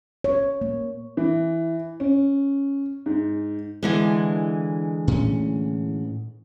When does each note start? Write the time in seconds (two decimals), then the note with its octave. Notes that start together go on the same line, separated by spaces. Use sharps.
0.24 C#5
0.61 A#3
1.17 E3
2.00 C#4
3.06 G#2
3.83 D3 E3 G#3
5.08 A2 C#4